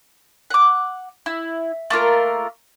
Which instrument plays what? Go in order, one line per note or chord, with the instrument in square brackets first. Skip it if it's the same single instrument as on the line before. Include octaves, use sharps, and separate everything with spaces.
[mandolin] F#5 D6
E4
A3 A#3 F4 A#4